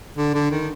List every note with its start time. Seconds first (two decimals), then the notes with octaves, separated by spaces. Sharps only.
0.17 D3
0.34 D3
0.51 D#3